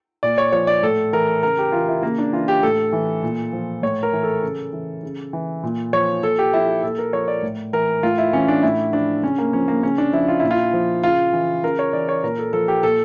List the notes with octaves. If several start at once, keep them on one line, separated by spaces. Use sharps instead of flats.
A#2 D5
C#5
F3 C#5
D5
A2 A4
E3 A#4
C#3 A#4
G4
E3 F4
E4
C#3 A#3
D4
E3 F4
G4
A2 A4
E3
A#2
F3
A2 C#5
A#4
E3
A4
C#3
E3
C#3
E3
A#2
F3 C#5
A#2 A4
G4
F3 E4
G4
A#2 A4
A#4
F3 C#5
D5
A2
E3 A#4
A2 F4
E4
E3 C#4
D4
A2 E4
F3 D4
C#3 C#4
A#3
F3 C#4
A#3
C#3 C#4
D4
F3 E4
F4
A#2 E4
F4
F3
C#3 F4
E3
C#3 A#4
C#5
E3 D5
C#5
A#2 A#4
A4
F3 A4
G4
A#2 A4